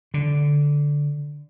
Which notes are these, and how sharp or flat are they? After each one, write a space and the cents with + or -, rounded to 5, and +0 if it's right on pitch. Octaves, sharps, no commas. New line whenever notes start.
D3 -10